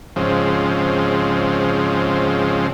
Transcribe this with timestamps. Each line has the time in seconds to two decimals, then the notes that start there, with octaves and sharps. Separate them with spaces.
0.16 G#2 C#3 F3 C4